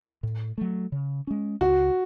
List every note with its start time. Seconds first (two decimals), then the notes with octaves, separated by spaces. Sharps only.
0.23 A2
0.58 F#3 A3
0.92 C#3
1.27 G#3 C#4
1.61 C#2 F#4